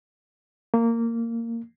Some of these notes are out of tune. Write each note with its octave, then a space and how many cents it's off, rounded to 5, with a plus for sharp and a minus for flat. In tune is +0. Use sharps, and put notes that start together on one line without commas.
A#3 -15